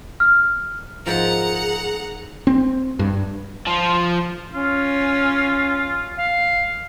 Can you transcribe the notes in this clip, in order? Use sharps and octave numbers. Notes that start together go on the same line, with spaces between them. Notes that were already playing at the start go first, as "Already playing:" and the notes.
F6
G#2 F3 G#4 A#4 F#5 A#5
C4
G2
F3
C#4 F4
F5